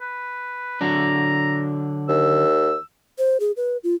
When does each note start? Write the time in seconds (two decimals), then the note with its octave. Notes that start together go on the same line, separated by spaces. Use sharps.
0.01 B4
0.81 D3 F#3 D4 A#5
2.09 D#2 E6
3.18 C5
3.40 G#4
3.57 B4
3.84 F4